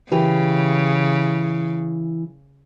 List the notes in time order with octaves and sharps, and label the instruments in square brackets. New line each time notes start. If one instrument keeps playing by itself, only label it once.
[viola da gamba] C#3 [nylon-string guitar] E3 G4 B4